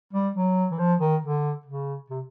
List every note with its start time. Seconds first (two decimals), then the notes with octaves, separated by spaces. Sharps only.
0.13 G3
0.36 F#3
0.72 E3
0.79 F3
1.00 D#3
1.22 D3
1.65 C#3
2.10 C3